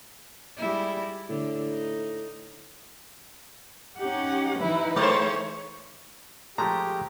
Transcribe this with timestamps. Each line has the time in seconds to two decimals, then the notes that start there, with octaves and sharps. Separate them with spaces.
0.57 G3 G#3 E4
1.29 A2 D3
1.69 D#4
3.99 C#4 D#4 G4 F#5
4.60 E3 D#4 E4 B4
4.96 G#3 A3 C5 C#5
6.58 F3 G#3 A3 G4 A#5